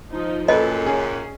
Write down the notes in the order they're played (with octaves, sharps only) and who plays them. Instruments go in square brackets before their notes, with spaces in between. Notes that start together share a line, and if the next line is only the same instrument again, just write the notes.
[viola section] F3 D#4
[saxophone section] F#2 A#2 [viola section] A4 [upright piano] B4 [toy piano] D#5
[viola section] C#4 [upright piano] G#4